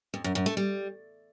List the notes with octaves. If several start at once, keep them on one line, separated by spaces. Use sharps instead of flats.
F2
F#2
F#2
A3
G3